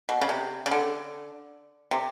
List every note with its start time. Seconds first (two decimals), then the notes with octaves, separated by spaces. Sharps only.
0.09 B2
0.21 C#3
0.29 C3
0.66 C#3
0.71 D3
1.91 C3